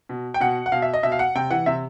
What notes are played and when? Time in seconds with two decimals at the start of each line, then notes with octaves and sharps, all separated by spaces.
0.09 B2
0.34 G5
0.40 B2 F#5
0.66 F#5
0.72 B2 F5
0.82 E5
0.93 D#5
1.03 B2 E5
1.12 F5
1.19 F#5
1.35 C3 G5
1.50 E3 F#5
1.66 C3 E5